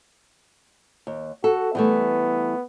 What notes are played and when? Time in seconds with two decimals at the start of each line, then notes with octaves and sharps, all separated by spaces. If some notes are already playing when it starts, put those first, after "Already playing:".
1.07 D#2
1.44 F#4 A4
1.75 E3 G3 A3 B3